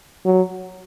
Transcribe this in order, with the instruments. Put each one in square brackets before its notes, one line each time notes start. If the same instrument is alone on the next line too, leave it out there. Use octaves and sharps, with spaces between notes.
[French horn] F#3